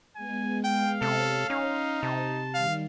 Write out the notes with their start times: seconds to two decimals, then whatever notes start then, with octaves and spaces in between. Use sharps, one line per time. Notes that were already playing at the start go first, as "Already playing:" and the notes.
0.16 G#3 B3 G#5
0.64 F5 G5
1.02 C3 A4 C#5
1.50 C#4 D#4 C6
2.03 C3 A5
2.54 D#3 G3 F5